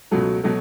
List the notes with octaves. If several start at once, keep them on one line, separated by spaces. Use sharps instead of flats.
C#2 B2 F#3 A3
B2 F#3 A3